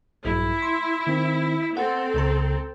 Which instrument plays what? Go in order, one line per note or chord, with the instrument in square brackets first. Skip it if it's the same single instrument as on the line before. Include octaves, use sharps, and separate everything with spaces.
[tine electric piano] A#1 G2 F#3 [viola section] E4
[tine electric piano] C6
D#3 C4
[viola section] C4 A4 [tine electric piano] F#5
[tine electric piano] C#2 C#3 A#5